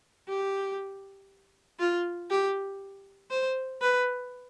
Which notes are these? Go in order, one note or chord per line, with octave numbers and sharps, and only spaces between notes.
G4
F4
G4
C5
B4